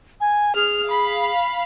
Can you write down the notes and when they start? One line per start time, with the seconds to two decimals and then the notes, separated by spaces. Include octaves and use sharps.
0.21 G#5
0.55 G#4 F6
0.88 F5 B5